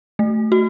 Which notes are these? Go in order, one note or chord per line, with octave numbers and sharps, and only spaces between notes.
A3
F#4